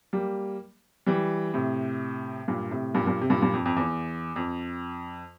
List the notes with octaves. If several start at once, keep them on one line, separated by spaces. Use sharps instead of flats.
G3 A#3
E3 G3
A2 C3
G2 A#2
A2 C3
G2 A#2
G2 A#2
C3
G2 A#2
G2 A#2
F2
F2
E2
F2